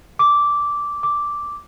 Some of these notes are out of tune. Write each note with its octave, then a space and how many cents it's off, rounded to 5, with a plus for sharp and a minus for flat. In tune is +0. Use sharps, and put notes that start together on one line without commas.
D6 -10
D6 -5